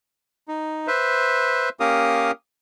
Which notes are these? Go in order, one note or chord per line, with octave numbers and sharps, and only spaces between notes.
D#4
B4 C5 E5
A#3 C#4 G4 A#4 F5 D#6